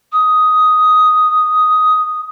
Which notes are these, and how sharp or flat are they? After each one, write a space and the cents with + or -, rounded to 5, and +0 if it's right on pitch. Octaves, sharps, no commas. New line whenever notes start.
D#6 +5